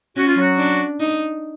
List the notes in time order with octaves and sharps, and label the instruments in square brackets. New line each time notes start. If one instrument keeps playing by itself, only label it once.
[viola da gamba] C#4 [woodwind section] F#4
[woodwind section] F4
F#3 F#4
[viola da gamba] D4
D#4